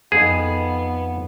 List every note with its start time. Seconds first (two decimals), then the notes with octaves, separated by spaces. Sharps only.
0.12 F2 B3 D#4 G#4